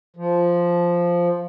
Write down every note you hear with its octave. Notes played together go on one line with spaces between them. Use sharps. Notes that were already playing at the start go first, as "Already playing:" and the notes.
F3